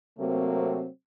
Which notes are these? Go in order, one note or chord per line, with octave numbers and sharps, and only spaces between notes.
C3 F#3 A3 A#3 C4